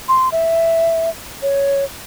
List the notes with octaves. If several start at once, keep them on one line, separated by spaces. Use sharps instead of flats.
C6
E5
C#5